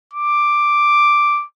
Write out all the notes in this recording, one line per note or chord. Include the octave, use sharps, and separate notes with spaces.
D6